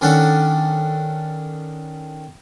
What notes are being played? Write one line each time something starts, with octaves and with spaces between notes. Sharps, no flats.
D#3 C#4 D4 A4 F#5